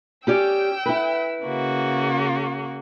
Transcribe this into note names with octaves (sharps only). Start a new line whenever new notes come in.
C#4 G4 D5 G5 E6
E4 B4
C#3 A#3 F#4